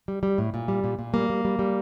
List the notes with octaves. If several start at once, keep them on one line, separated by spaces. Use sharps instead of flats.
G3
G3
A2
A#2
G3
A#2
A#2
G3 A#3
G3
G3
G3